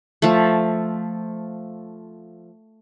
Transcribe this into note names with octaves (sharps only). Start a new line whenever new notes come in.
F3 A3